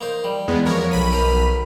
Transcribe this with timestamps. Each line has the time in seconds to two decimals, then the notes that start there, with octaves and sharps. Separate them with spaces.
0.01 A#3 D#4 C5
0.24 G3
0.48 E2 G#3 B3
0.66 F3 F#4 A#4 C#5
0.91 B1 B5 D#7
1.12 A#4 C5 A#5